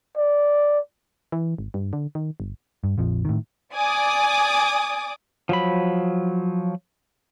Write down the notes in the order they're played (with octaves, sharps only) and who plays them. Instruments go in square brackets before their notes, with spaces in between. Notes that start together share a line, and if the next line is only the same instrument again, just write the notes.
[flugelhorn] D5
[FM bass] E3
G#1
G2
D3
D#3
G1
[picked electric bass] G2
A#1 F2 F3
A2 D#3
[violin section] D5 G#5 D6 D#6
[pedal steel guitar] F3 F#3 B5